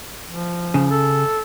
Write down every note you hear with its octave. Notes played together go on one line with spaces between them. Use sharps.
F3
C#3
A4